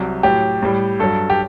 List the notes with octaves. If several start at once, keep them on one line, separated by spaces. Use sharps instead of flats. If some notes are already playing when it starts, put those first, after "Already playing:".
Already playing: C2 C3 F#3
A2 F#3 G4
A2 G3
G2 F#3 A4
G4